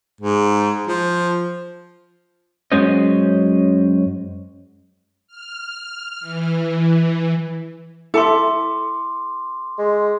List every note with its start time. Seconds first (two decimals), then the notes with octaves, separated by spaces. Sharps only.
0.21 G#2
0.88 F3
2.72 F#2 G#3 C#4 F#4 C5 D#5
5.28 F6
6.20 E3
8.14 E4 A4 E5 A5 C6 D6
9.78 G#3